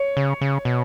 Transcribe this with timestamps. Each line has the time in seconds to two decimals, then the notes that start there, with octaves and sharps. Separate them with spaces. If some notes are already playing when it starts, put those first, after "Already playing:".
Already playing: C#5
0.17 C#3
0.41 C#3
0.65 B2